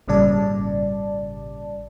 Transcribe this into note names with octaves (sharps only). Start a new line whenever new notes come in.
G#1 A#2 C#3 G3 D5 A5